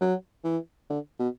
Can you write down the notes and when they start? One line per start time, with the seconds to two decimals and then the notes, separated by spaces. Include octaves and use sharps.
0.01 F#3
0.44 E3
0.90 D3
1.19 B2